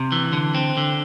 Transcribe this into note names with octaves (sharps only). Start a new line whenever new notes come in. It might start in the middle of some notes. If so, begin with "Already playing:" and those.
Already playing: C3
E3
D3
C4
D3